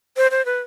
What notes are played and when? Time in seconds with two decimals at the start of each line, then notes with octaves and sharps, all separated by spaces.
0.17 C5
0.31 C5
0.45 B4